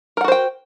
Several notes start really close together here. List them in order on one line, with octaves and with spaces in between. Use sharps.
A#4 F#5 F#4 C5 G5